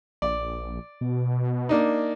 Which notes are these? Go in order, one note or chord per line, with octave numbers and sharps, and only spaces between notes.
A#1 D5
B2
A#3 D4 D#4